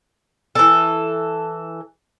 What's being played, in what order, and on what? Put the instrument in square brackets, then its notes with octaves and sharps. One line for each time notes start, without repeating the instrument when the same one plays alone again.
[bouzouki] E3 A4